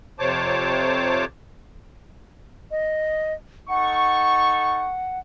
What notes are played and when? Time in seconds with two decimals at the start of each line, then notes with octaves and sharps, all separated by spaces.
0.19 F2 C3 C5 C#5 A5 D6
2.71 D#5
3.69 D#4 A4 F#5 C#6